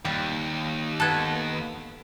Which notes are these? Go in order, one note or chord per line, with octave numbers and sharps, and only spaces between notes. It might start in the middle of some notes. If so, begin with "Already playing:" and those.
D#2 G3
B3 A4 A5 F#6 G#6